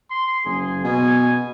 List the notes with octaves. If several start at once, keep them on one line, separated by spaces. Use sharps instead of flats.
C6
F#1 G#4
B2 G#5